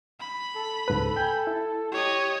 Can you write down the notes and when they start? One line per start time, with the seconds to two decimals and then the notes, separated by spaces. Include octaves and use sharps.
0.20 B5
0.55 A4
0.88 C#2 G#2 A4 B4
1.16 G5 G#5 G6
1.47 E4
1.92 G4 C#5 D#5